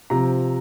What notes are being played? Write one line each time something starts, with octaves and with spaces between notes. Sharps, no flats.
C3 F3 C4 A#5